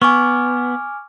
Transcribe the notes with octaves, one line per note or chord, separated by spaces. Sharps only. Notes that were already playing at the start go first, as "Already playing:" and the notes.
B3 G#5 C#6 D6 F6